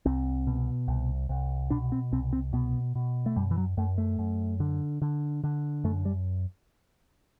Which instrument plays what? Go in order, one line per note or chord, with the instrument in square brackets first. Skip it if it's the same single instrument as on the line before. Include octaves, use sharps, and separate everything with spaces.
[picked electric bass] C2 C4
B2
C2
C2
B2 D4
C4
C2 C4
C4
B2 B3
B2
A3
F#2 G3
E3
F#3
F#2 A3
A3
F#2
D3
D3
D3
F#2 A3
G3